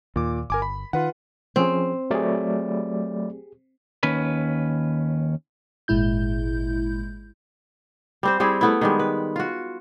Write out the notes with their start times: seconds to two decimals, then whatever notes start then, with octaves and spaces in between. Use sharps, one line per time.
0.16 D#2 A#2 D6
0.50 G1 A#4 G#5 D6
0.62 B5
0.93 D#3 F4 B4 F#5
1.56 F3 C4 C#4 G#4
2.10 F#3 A3 G4 G#4 D5
4.03 D#2 C#4 B4
5.88 G#1 A#2 G#3 E4 G6
8.23 G3 C4 C5
8.40 G3 C4 E4 G#4
8.61 A3 B3 E4
8.81 D#3 G3 G#3
8.99 B4
9.36 F4 F#4